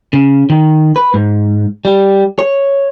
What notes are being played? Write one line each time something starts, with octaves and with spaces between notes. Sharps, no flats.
C#3
D#3
B4
G#2
G3
C#5